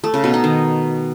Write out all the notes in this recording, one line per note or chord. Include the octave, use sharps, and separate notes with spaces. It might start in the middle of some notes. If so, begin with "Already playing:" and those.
A3
C#3
B2
D#4
D#3